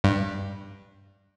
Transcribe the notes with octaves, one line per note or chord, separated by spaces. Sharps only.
G2